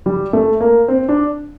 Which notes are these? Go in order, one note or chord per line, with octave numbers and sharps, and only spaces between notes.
G3
A3
A#3
C4
D4